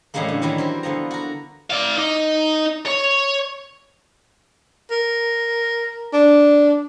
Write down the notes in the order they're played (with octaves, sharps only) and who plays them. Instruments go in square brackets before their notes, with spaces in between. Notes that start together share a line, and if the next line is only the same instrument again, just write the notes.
[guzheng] A2 C#3 E3 G3 G#3 A#3
D3
D#3 E3 F#3 G3 C#4
C4 A#4 E5
D3 F3 B3 A#5
F#4 A#4
[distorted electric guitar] D5 F5
D#4
C#5
[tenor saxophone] A#4
D4